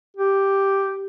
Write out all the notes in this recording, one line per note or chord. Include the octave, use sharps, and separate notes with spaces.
G4